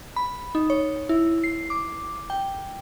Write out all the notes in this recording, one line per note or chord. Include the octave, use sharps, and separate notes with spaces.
B5
D#4
C#5
E4
C7
D6
G5